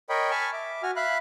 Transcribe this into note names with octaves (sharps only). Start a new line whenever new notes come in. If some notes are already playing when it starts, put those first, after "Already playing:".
A#4 C#5 D#5 G5 B5
G#5 A5 B5 C#6 F6
E5 D6
F#4 G#5 F6
E5 F5 B5 F#6